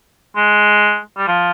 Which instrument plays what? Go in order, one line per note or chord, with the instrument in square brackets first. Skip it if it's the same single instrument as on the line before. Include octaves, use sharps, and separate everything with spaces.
[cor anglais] G#3
G3
F3